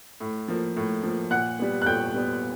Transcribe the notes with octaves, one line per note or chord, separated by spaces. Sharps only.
A2
F3 A#3
A2
F3 A#3
A#2 F#5 F#6
G3 B3
F#6
A#2 G5 G6
G3 B3